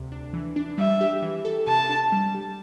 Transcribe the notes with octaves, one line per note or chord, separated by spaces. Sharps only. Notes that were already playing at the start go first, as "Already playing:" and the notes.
Already playing: D2 C3
D4
E3
D4
G3 E5
G4
E3
A4
C3 A5
D4
G3
G4